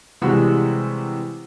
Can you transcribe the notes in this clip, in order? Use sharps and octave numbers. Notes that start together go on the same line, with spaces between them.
C3 E3 G3 G#3 F#4